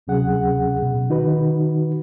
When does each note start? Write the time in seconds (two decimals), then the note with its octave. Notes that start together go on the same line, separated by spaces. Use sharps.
0.07 D2 C3 F#3 C#4 G#4 F#5
0.82 B2
1.09 D#3 D#4 F#4 B4